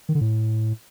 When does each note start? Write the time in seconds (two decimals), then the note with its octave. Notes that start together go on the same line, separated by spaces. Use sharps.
0.09 D#3
0.15 D3
0.21 A2